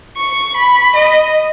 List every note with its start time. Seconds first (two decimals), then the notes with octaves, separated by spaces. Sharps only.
0.17 C#6
0.57 B5
0.96 D#5